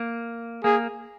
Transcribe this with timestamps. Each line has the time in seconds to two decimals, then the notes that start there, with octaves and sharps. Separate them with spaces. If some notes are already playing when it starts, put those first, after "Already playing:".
Already playing: A#3
0.64 A#3 G#4